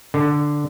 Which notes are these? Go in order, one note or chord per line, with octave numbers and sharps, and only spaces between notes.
D3